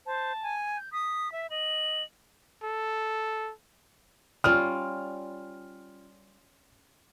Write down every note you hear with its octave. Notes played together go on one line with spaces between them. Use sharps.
C5 A5
G#5
G6
D#6 B6
E5
D#5 F#7
A4
G3 C#4 F4 F6